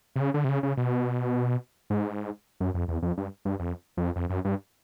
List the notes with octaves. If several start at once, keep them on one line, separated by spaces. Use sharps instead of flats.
C3
C#3
D3
C3
C#3
C#3
B2
G#2
F#2
F2
E2
F2
G2
G2
F2
F2
F2
F#2
G2